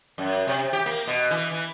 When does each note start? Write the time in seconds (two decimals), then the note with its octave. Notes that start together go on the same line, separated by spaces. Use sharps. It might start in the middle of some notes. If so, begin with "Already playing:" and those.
0.18 F#2
0.47 C3
0.73 G4
0.86 A#3
1.07 B2
1.31 E3
1.51 E3